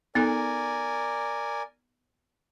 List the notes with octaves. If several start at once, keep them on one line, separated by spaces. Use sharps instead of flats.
B3 D#4 A4 A#4 D5 G#5